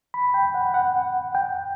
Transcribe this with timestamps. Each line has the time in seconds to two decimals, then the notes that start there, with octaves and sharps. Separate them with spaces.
0.14 B5
0.34 G5
0.54 F#5
0.74 F#5
1.35 G5